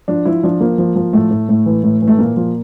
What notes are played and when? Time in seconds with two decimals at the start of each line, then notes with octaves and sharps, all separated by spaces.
0.08 F3 D4
0.25 F3 E4
0.43 F3 D4
0.61 F3 A#3
0.78 F3
0.96 F3
1.13 A2 A3
1.31 A2
1.49 A2
1.66 E3
1.83 A2
2.02 E3
2.07 A3
2.19 A#2 A#3
2.36 F3